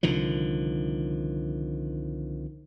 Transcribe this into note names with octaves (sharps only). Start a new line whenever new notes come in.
C2 D3 D#3 F3